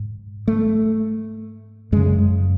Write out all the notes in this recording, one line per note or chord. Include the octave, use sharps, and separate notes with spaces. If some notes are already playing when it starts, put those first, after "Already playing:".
Already playing: G#2
A3
F#2 C#3 G#3